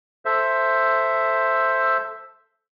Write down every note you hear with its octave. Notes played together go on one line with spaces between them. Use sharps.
A4 C5 E5